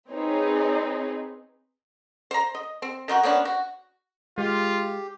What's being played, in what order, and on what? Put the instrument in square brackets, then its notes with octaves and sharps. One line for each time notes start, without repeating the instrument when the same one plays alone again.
[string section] C4 D#4 G#4 B4 C#5
[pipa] C5 A#5
D#5
C4
D#3 D#4 F4 F#4
A#3 B3 C#4 D4
F#4
[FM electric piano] G#3 [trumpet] F4 [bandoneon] G4